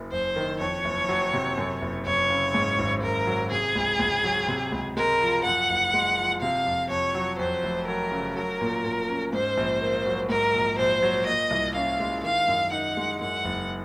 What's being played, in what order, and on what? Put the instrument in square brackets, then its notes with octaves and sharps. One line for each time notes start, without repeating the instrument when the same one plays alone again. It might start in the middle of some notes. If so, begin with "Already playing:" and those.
Already playing: [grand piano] F#1 F#2
[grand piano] F#1 [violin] C5
[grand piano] D#3
[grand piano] F2 [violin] C#5
[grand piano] F#1
F#3
C3
F#2
F#1
[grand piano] F#1 [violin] C#5
[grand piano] C#3
G#2
G#1
[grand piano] G#1 [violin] A#4
[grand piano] F#3
[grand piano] C3 [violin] G#4
[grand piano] C#2
C#2
F#3
C3
C#2
[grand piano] G#3 [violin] A#4
[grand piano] F3
[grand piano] F#2 [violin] F#5
[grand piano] F#1
G#3
F3
[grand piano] C3 [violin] F5
[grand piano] F2
[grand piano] F2 [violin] C#5
[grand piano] F#3
[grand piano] F2 [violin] C5
[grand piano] F1
[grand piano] F#3 [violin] A#4
[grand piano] C#3
[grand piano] F#3 [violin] A#4
[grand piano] A#2
A#2
C#4
[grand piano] G#2 [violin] C5
[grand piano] A#1
A#3
F#3
[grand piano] G#2 [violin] A#4
[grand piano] A#1
[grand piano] A#1 [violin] C5
[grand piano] F#3
[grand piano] A#2 [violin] D#5
[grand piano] C2
[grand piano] C#4 [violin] F5
[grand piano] G#3
[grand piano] D#3 [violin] F5
[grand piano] F#2
[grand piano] D#4 [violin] F#5
[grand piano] G#3
[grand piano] F#2 [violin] F#5
[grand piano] F#1